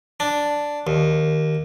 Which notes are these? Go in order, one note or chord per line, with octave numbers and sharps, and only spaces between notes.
D4
D#2